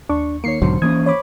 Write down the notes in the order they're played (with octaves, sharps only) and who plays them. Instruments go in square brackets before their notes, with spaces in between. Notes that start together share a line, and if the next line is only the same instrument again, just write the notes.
[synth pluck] D#2 C#6 [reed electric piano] D4
[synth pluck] D#3 C7 C#7 [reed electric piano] A#3 C#5
[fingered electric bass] B1 G#2 D3 [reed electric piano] F#3 [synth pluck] C5
[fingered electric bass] E3 A#3 C#4 [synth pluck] D#6 [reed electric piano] G#6
[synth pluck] C#5 B5 D6